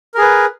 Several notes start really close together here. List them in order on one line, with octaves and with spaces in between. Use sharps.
A#4 G#4 B4